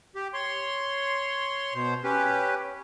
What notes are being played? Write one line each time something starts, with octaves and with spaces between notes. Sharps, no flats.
G4
C#5 C6
B2 C5
C#4 G4 B4